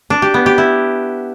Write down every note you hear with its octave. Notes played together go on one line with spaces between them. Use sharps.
D4
G4
B3
G4
E4